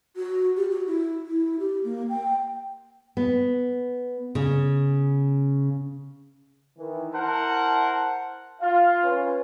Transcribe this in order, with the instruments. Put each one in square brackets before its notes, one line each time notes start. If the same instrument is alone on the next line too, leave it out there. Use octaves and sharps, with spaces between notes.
[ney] F#4
G4
F#4
E4
E4
G4
A#3
G5
[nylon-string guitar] B3
C#3
[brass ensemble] D#3 E3
[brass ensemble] E4 A5 [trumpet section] A#4 C5 F#5
[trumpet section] F4 [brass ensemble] F5
[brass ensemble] C#4 B4